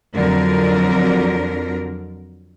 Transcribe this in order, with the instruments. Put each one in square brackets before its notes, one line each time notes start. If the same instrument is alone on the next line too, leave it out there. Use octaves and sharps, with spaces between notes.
[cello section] F2 D3 F#3 A#4